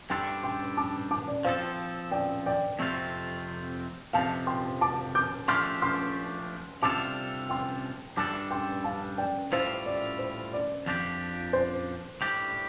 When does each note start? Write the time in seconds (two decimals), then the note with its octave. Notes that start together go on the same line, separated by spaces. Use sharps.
0.10 G2 G3 D4 A4 G5 C6
0.43 G5 C6
0.77 A5 D6
1.11 A5 D6
1.28 D5
1.44 F3 C4 A4 C5 F5
2.12 D5 G5
2.46 D5 G5
2.79 F2 C3 A3 C4 F4
4.13 F2 C3 F3 F5 A5
4.47 G5 C6
4.81 A5 D6
5.15 D6 G6
5.48 F3 A3 D4 G4 C6 F6
5.82 C6 F6
6.82 C3 G3 D4 F4 A4 A5 D6
7.50 G5 C6
8.17 G2 G3 D4 A4 A5 D6
8.51 G5 C6
8.84 F5 A5
9.18 D5 G5
9.52 A2 G3 F4 A4 C5 F5
9.86 D5
10.19 C5
10.53 D5
10.86 F2 F3 D4 G4
11.53 C5
12.21 A2 G3 D4 G4